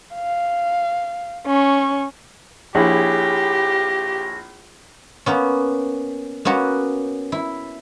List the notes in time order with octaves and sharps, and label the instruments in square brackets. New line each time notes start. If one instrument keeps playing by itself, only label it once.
[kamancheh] F5
C#4 C#6
[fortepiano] A#1 [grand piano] E4 G#4 C#5 [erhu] G4 [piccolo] A#6
[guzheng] A#3 B3 C#4
A#3 B3 C#4 F#4
E4